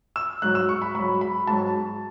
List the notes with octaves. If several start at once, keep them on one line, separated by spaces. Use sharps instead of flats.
E6
G#2 F#3 F#6
E6
C#6
B5
G#2 F#3 B5
B5
G#2 F#3 A5